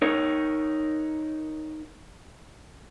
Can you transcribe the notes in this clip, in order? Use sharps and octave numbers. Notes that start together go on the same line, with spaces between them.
D#4 A#4 C#5